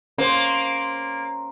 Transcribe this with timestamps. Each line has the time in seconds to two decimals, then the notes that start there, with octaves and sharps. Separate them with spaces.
0.18 A#3 C#4 C5